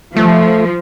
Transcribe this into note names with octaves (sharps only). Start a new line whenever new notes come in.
F3 A3